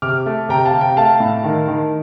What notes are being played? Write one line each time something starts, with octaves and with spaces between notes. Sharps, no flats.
C3 D6 F6
A3
C3 G5 A#5
F5 A5
C3
G5 A#5
A3 F5 A5
A2
D#3
D#3